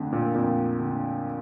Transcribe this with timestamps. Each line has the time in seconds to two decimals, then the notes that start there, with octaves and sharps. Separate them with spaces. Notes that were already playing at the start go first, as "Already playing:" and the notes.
Already playing: F2 D3 A3
0.12 A#2
0.35 F2 A#2
0.79 D3